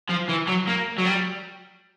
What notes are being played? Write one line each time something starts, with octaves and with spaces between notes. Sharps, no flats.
F3
E3
F#3
A#3
F#3
G3